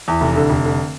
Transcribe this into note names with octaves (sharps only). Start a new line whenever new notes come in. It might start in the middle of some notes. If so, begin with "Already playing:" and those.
E2
F1
D3
F1
D3